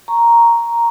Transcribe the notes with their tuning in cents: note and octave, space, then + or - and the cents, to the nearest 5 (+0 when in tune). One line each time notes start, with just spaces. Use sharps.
A#5 +0 C#6 +0